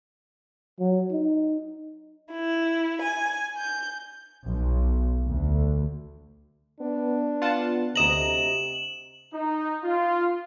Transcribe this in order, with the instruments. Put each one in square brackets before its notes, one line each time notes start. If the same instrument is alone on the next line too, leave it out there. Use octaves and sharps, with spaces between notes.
[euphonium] F#3
D#4
[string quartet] E4
G#5
G6
[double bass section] B1
D2
[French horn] B3 [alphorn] D4
[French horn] B3 [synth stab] F4 F#5 A5
[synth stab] D2 D#5 A#5 [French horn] C3 [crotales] E7 F#7
[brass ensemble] D#4
F4